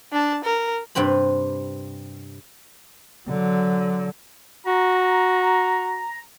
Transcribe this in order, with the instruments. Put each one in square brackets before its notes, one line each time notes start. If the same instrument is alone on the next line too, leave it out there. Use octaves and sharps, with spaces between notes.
[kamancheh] D4 A5
A#4
[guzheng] G2 C3 C4 B4 B5
[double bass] D3 F#3
[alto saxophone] F#4 [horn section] A#5